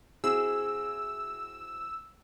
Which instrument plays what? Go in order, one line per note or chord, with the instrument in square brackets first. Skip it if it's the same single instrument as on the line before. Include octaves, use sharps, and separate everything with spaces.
[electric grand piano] C4 E4 F#4 [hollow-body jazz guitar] G#4 [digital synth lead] E6